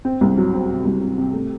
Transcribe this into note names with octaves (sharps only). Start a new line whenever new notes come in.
C4
C2
F#3
C4
C3
C2
C3
C3
A3